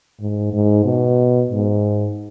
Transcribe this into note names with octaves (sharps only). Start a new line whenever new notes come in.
G#2
G#2
B2
G#2